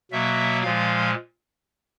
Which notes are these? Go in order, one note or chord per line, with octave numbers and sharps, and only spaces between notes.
B2 F#3 A#3 E5
A#2 F3 G#3 F5